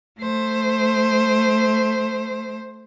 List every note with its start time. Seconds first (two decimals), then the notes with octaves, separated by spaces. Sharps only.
0.21 A3 C5